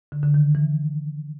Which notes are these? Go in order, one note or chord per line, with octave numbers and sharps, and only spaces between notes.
D3
D3
D#3
E3